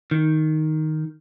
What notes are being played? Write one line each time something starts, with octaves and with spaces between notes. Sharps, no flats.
D#3